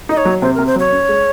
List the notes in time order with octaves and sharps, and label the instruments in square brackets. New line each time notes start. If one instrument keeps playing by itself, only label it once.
[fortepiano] D#4 [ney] D#5
[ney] C#5
[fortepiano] F#3
[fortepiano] C3 [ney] C5
[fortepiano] C3 [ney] A#4
[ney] C5
[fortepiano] F#3 [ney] C#5
[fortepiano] C#4
G#3